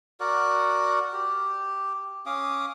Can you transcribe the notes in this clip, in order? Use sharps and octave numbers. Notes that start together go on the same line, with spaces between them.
F#4 A#4 D5 F#5
G4
C#4 F5 D6 D#6